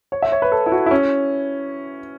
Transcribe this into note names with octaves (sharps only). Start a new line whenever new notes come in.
C#5
E5
C#5
B4
A4
E4
F#4
E4
C#4